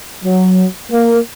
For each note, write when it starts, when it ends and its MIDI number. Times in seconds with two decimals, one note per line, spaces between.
0.24 0.65 54
0.91 1.18 58